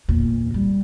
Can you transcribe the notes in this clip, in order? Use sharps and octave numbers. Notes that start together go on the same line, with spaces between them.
E2 A#2
G3